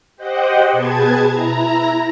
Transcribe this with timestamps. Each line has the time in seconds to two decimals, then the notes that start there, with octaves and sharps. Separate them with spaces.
0.16 G4 C5 D#5 F#5 G5
0.72 B2 G#4 B4 A5 G#6
1.29 E4 A#5